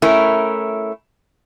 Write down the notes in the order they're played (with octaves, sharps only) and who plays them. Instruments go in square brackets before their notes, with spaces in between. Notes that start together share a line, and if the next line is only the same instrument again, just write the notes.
[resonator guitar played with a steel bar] A3 C#4 E4 A#4